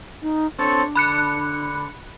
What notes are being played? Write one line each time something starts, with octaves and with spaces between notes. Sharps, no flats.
D#4
C4 D4 A4 C#5
D3 B5 F#6 C#7